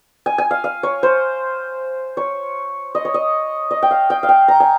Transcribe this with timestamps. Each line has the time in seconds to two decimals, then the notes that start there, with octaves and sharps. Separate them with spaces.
0.26 G#5
0.38 G#5
0.51 F5
0.64 F5
0.83 C#5
1.03 C5
2.17 C#5
2.95 D#5
3.05 C#5
3.14 D#5
3.71 D#5
3.83 G5
3.91 F5
4.10 G5
4.23 F5
4.29 G5
4.48 A#5
4.60 G#5